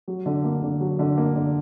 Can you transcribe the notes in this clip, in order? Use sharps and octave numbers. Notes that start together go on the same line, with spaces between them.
F#3
D3
A#3
D3
F#3
D3
A#3
D3